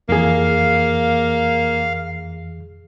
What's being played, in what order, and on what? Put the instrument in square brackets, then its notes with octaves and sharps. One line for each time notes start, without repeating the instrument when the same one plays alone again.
[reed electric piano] F2 E3 G#4 [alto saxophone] A#3 [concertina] F5